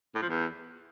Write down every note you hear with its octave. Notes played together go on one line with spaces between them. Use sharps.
A2
F3
E2